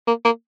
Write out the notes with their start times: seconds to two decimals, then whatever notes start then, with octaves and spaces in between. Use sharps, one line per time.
0.07 A#3
0.25 A#3